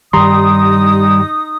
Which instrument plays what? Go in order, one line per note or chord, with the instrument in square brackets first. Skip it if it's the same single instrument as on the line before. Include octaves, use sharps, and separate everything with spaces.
[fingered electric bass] G2 D#3 [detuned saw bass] G3 [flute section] D#4 D#6 [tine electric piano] A#5 C6